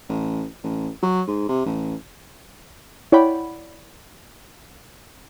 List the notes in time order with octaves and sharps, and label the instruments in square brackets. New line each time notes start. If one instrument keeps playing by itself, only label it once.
[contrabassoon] A1
A1
F#3
G#2
C3
A1
[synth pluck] E4 C#5 D5 F#5 G5 B5